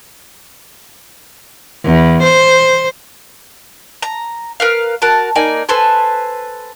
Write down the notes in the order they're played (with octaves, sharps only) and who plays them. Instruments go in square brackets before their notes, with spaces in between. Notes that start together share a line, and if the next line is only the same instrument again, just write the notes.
[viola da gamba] E2
C5
[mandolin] A#5
A#4 B4 F5
F#4 A#4 A5
A#3 D#4 D5 G#5
A4 B4 C5 G#5